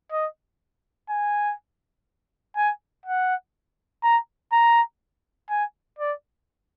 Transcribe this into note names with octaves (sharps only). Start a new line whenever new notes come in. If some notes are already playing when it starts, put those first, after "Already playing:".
D#5
G#5
G#5
F#5
A#5
A#5
G#5
D5